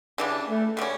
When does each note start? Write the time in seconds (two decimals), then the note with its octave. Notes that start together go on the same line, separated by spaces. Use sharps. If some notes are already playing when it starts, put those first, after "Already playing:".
0.18 C#3 E3 G3 D4
0.48 A3
0.77 C#3 G3 C#4